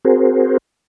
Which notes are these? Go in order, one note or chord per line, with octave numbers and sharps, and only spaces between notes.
C4 F#4 G#4 A#4 C5